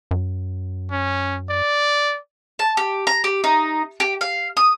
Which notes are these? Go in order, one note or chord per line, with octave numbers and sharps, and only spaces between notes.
F#2
C#4
D5
A5
G4
A#5
G4
D#4
G4
F5
D#6